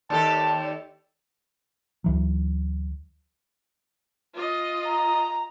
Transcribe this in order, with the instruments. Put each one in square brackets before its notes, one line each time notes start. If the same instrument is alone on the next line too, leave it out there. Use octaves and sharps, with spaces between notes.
[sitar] D#2 G4 A4 [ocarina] D5 [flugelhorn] A5
[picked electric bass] D2 E3 F#3
[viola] F4 D#5
[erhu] A#5